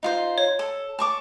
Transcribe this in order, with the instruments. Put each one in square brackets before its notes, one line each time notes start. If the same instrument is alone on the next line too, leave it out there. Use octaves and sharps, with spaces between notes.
[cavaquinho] D#4 F4 C5
[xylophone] C#5
[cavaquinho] A4
A5 C#6 D6